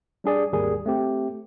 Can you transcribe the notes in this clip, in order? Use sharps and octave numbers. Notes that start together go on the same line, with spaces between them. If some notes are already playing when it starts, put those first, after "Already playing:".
G3 D4 G#4 D5
G#1 D#2 G3 G#4 A#4
A3 C4 G4